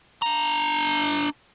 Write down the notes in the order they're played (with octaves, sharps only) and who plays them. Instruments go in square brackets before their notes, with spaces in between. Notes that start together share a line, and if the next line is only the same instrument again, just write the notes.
[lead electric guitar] D4 A#5